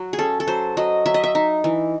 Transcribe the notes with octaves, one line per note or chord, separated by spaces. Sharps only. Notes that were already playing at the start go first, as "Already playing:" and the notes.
Already playing: F#3 F#4
G#4
C#4 A4
A4
F#3 C5
F#3 D#5
F#3 E5
D#5
E5
D#4
E3